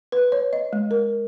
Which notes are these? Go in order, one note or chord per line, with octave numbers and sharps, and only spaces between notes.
B4
C#5
D#5
G#3
A#4